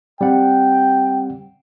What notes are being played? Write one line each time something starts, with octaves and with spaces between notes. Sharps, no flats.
G3 C4 F#5 G5